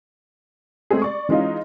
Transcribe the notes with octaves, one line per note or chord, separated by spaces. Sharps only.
G#3 A3 C4 G#4
D5 C#6
E3 G#3 C#4 D#4 F4